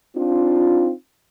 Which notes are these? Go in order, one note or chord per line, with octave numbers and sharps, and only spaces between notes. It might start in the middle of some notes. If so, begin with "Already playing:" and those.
C4 D4 D#4 F4